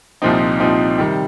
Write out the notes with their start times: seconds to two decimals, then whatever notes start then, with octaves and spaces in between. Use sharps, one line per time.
0.22 C2 A#2 F3 C4 D#4
0.60 C2 A#2 F3 C4 D#4
0.98 C3 D#3 G3